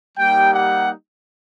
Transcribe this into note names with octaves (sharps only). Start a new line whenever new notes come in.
G3 A#3 D#4 G4 G5
F#5